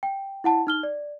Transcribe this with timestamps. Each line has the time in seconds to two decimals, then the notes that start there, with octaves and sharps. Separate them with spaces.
0.03 G5
0.44 E4 F#5 A5
0.67 D#4 F6 G7
0.83 D5